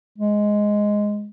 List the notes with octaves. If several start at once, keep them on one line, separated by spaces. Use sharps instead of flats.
G#3